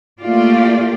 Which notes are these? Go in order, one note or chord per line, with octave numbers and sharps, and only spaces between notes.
A3 A#3 F4 G4 D5